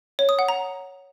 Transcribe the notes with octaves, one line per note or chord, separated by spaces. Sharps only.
C#5
D#6
F#5
A#5